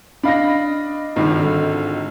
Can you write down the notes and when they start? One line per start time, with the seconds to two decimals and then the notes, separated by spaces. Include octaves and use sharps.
0.23 D4 D#5 F5 B5 A#6
1.16 G#1 C#2 G2 D#3
1.40 D3